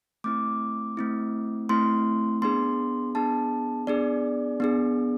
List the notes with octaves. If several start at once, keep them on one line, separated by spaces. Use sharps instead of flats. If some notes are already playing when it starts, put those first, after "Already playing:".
A3 C4 E4 D6
A3 C4 E4
A3 C4 E4 C6
B3 D4 G#4 C6
B3 D4 G#4 A5
B3 D4 G#4 D5
B3 D4 G#4